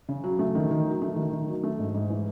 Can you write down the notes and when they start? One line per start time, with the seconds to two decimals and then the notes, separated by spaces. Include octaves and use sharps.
0.08 C#3
0.24 F#3
0.39 A3
0.55 D#3
0.71 D#3
0.86 F#3
1.02 A3
1.16 D#3
1.33 D#3
1.48 F#3
1.63 A3
1.79 G#2
1.94 G#2
2.10 E3